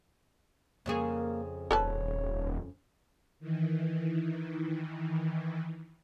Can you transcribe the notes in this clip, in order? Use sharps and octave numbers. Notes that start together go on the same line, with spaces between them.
F2 C#3 A#3 G#4
D#1 A4 B4 C#5 A5
D#3 E3